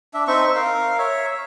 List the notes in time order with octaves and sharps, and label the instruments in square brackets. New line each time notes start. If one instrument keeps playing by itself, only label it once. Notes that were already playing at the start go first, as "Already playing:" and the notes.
[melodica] D4 E5
C4 D#4 E5 C#6
A#4 F5
C#5 E5